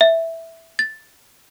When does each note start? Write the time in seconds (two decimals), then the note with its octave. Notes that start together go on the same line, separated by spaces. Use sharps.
0.01 E5
0.79 A6